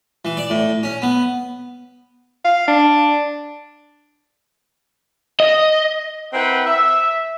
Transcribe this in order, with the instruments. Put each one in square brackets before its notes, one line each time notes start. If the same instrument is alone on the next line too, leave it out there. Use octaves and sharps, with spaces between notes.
[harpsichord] E3
D5
A2
C#4
B3
[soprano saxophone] F5
D4
[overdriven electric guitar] D#5
[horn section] C4 E4 A#4 B4 F#5 G5
E5